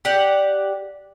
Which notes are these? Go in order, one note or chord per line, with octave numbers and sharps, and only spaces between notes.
G4 D5 F#5